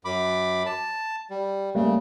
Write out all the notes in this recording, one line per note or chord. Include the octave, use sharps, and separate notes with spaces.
F#2 B5 D6
A5
G3
C#3 G3 A3 A#3